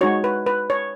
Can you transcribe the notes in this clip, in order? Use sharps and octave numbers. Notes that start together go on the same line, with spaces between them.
G#3 D#4 F#4 C#5
B4
B4
C#5